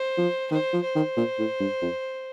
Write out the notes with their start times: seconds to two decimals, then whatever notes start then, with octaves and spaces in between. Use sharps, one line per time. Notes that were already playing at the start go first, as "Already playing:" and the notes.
Already playing: C5
0.18 F3
0.51 D#3 C5
0.73 F3
0.84 C5
0.95 D#3
1.17 A#2
1.39 A2
1.60 G2
1.82 F2